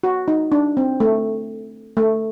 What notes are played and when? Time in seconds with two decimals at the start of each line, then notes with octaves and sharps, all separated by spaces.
0.03 F#4
0.28 D#4
0.52 D4
0.77 C4
1.00 A3
1.97 A3